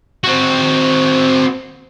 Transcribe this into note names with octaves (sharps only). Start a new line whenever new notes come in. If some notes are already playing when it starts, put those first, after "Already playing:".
C4 F#4